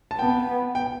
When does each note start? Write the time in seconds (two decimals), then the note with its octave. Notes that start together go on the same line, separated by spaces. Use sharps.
0.11 A5
0.18 B3 G5
0.75 G5